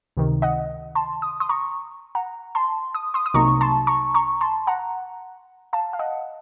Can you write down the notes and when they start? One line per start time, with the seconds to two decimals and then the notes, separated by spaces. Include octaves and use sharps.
0.17 C#2 C3 D#3
0.42 D#5 F#5
0.95 A5 C6
1.22 D#6
1.40 C6 D#6
1.49 A#5 C#6
2.15 F#5 A#5
2.55 A5 C6
2.95 D#6
3.14 C6 D#6
3.26 D#6
3.34 C2 C3 F#3 A#3 D#4 A#5 C#6
3.61 A5 C6
3.87 A#5 C#6
4.14 A#5 C#6
4.41 A5 C6
4.67 F#5 A#5
5.73 F5 A5
5.93 F5
5.99 D#5 F#5